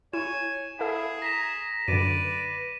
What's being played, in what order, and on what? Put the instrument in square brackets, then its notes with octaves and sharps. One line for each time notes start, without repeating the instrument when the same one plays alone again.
[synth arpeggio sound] E4 [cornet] C#5 [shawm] G#5 [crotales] E7
[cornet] E4 [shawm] G#4 [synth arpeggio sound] A4 F5 F#5
[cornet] A#5 [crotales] A#6 B6 E7
[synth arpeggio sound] F#2 D3 [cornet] B4 [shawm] D5 [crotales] D#7